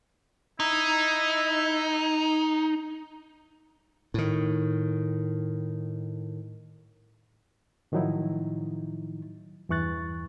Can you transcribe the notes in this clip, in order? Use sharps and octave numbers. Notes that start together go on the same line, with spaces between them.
D#4 E4
A2 D#3
A2 D#3 F3 F#3 D#4 E4
E2 G2 E3 C#6 F#6 A6